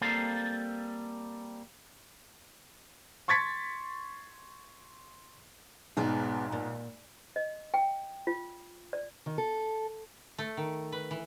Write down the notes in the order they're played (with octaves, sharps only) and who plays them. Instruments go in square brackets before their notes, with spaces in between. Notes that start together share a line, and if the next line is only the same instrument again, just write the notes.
[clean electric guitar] G3 A#3 C4 A4 F5
[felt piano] C6 C#6 G#6 A6 B6 C#7
[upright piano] B1 G#2 [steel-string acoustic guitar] G#3 B3 D5
[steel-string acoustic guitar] A#2
[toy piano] D#5
G5
F4
D5
[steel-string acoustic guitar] D#3
A4
[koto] A3
D#3
B4
E3